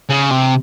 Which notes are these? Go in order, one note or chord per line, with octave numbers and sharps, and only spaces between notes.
C#3
C3